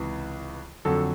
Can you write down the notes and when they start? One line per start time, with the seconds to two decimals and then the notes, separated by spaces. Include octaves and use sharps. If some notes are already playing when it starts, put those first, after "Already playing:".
Already playing: C#2 C3 E3
0.85 F2 D3 F#3 A4